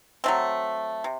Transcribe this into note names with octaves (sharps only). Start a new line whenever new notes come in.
F#3 A3 C4
C3